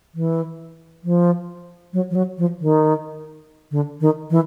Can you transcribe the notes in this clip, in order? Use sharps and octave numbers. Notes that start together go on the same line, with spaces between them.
E3
F3
F#3
F3
F#3
F3
D#3
D3
D#3
E3